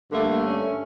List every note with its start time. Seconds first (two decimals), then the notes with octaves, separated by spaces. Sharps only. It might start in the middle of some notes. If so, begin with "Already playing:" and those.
0.11 G2 D3 A3 A#3
0.45 C#4